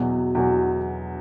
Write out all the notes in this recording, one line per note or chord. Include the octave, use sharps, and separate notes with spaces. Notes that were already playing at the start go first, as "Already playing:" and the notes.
Already playing: E2 B2 F#3
E2 B2 F#3